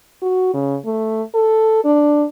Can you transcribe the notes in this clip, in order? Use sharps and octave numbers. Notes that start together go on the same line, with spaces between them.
F#4
C#3
A3
A4
D4